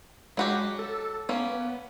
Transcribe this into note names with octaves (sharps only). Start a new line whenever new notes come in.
F#3 G#3 F#4 G4
A4
A#3 B3 C#4